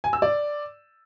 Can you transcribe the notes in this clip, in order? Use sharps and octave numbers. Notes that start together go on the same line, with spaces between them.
G#5
E6
D5